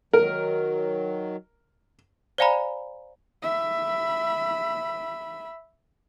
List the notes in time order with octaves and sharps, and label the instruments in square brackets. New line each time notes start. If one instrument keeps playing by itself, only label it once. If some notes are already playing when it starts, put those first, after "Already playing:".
[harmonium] D#3 F#3 [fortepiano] A#4
[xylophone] C5 D5 F5 G#5 A#5 B5
[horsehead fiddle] E5 B5